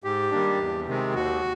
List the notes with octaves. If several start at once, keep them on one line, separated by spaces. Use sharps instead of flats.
G#2 G4
D#3 G3 A#3 D4
E2
C3 D#3 G#3 C4
D#2 F#4